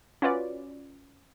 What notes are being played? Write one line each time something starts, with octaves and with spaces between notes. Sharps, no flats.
C#4 F4 F#4 B4 D5